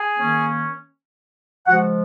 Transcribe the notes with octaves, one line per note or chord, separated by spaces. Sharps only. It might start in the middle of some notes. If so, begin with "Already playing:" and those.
Already playing: G#4 G#5
D#3 A#3 C#4
C#3 F3 G#3 F#4 F#5